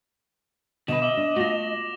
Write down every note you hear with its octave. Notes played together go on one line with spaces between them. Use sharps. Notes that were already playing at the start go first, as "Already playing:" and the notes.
B2 D3 B4 D#5 E7
E5 D6 F#7 G7
D4
A3 F4 F#4 A#6 F7 F#7